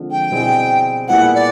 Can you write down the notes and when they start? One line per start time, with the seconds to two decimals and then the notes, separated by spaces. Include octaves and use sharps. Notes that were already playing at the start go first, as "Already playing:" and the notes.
Already playing: D3 F3 G#3 C4
0.11 G5
0.30 B2 G3 C4 E4 G#4
1.08 A#2 G3 B3 E4 G#4 F#5
1.35 D5